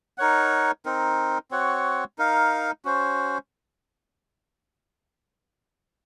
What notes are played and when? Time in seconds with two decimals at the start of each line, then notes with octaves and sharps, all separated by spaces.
0.18 D#4 A#4 C#5 F#5
0.85 C4 D#4 A#4
1.51 C4 F#4 C#5 F#5
2.19 D#4 A#4 F5
2.85 C#4 F#4 C5